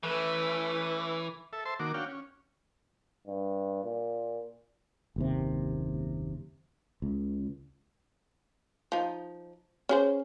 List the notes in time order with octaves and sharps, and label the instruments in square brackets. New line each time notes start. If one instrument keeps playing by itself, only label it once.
[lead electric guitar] E3 [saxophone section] A3 C#4 B4
[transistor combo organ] A4 E5
C5 E5 A5 C6
D#3 A#3 F#4 D6
D4 F#4 C#5 F5 G5
C#4
[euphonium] G2
A#2
[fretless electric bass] F#1 D#2 C3
C#2
[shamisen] F3 D#4
C#4 G#4 C5